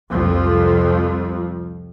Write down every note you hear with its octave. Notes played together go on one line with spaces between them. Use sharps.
C2 F2 F3